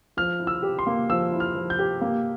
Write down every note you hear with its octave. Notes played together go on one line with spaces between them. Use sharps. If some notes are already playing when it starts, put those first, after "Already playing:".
F3 F6
E4
E6
G4
C6
A#3
F3 E6
E4
F6
F3
G6
G4
A#3